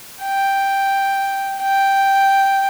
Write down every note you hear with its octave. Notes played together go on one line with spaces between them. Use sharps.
G5
G5